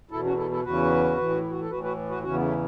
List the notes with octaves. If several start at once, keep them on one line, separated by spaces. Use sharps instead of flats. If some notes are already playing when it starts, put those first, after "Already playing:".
E2 B2 E4 A4
C#4 F#4
E4 A4
E4 A4
E2 C#3 E3 F#4 B4
A2 E3
C#4
E4
F#4
A4
A2 E3 F#4 B4
F#4 B4
F#4 B4
E2 C#3 E3 C#4 F#4
B3
A3 C#4